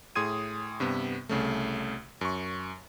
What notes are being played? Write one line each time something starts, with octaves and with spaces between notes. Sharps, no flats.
A2 G#4 C6 D#6 G#6 D#7
G2 C3 B3
C2 C#3 A3
F#2 C#6